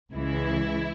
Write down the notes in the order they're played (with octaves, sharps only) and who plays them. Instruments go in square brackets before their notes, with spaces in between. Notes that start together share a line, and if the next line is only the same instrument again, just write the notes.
[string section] C#2 C#3 E3 G#3 E4